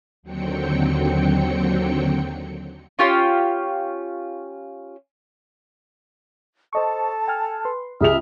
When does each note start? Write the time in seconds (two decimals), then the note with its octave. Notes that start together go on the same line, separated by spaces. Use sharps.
0.23 D#2 D3 F#3 C4 G5 C#7
2.99 C#4 F4 G4 C#5
6.73 A4 C5 D#5 A5 C#6
7.28 G5 G#5 F6
7.65 B4 C6
8.01 C#2 G4 G#4 E5 D#6 F6 F7